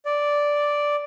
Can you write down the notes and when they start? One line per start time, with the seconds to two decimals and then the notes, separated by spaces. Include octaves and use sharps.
0.05 D5